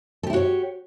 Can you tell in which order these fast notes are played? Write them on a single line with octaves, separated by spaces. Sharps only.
A4 G4 E4 F#4 C#5